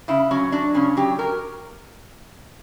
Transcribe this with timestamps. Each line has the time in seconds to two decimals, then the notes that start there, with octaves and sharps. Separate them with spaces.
0.08 C#3 E4
0.31 F#3 C#4
0.52 F#3 D4
0.75 C#3 C#4
0.97 F#3 G4
1.19 F#3 A#4